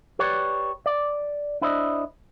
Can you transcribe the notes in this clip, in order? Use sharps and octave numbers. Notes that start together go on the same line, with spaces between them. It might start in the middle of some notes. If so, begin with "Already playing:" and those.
G4 B4 C#5 D5
D5
D4 E4 C5 D5 D#5